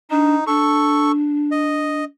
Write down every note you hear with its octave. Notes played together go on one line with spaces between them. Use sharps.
D4 D#4
D4 A4 C#6
D#5